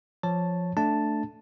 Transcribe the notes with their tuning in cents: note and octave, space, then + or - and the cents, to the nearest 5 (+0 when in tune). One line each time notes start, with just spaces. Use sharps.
F3 +0 C#5 +0 A5 +0
A3 +0 D4 +0 A5 +0